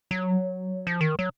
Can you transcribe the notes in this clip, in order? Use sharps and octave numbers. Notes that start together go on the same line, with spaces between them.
F#3
F3
D#3
F#3